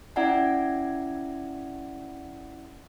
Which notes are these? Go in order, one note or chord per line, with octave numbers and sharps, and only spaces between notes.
C#4 E4 D5 E5 F#5 G#5